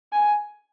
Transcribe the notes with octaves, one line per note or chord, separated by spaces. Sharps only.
G#5